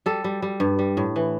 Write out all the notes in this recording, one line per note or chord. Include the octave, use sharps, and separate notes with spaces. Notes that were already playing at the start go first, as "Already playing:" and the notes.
G3 A4
G3
G3
G2
G3
A2
E3